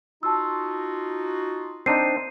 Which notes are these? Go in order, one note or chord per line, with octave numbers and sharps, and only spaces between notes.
D#4 F4 F#4 A5 E6
C4 D4 D#4 C7 D#7